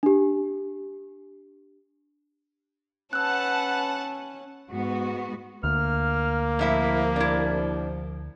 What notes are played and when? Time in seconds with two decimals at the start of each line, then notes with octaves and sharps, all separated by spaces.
0.03 D4 G4
3.13 C#4 B4 F#5 A5 E6 F#6
4.69 G#2 B3 F#4
5.64 D2 A#3 F6
6.59 C2 A2 F3 E4 E5
7.16 D4 E4